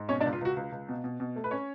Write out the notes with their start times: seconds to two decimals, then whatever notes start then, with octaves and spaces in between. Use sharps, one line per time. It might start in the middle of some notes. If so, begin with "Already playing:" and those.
Already playing: G#2
0.09 B2 C#4 C#5
0.20 D4 D5
0.25 C#2
0.33 F4
0.41 C#2 F#4
0.57 C#2
0.72 C#2
0.89 B2
1.04 B2
1.20 B2
1.36 A3
1.44 B4
1.51 C#4 C#5